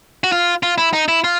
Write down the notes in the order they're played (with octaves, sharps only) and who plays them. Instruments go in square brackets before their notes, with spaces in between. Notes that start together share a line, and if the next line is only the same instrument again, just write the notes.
[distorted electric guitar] F#4
F4
F4
E4
D#4
E4
F4